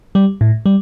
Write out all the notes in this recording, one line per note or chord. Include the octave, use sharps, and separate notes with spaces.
G3
A2
G3